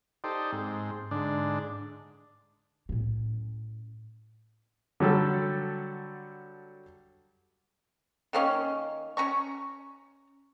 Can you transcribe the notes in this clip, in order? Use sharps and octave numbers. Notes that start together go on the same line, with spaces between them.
D#4 G4 A4 C5 D5
G#2 C4
G#2 D3 D4
A2 C#4
D3 F#3 G3 A4
D#3 A#3 C#4
C#4 A#5 C#6